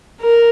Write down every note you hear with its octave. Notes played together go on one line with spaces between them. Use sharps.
A#4